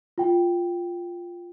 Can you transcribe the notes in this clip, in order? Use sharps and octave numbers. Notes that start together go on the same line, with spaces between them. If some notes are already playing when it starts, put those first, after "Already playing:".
F4 G5